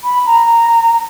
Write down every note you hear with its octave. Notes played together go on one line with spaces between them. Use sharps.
B5
A#5